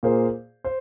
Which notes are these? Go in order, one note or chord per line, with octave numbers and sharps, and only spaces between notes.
A#2 A#3 G#4 C5
C5